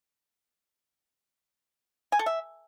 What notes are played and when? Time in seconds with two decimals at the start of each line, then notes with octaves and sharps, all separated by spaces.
2.12 G#5
2.19 A4
2.26 E5